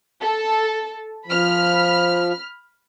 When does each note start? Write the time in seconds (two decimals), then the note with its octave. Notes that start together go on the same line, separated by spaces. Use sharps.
0.21 A4
1.27 F3 B5 F6